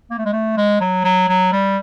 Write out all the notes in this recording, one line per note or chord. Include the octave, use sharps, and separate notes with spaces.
A#3
A3
G#3
A3
G#3
F#3
F#3
F#3
G3